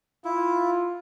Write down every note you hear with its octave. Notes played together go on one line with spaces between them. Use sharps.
E4 F4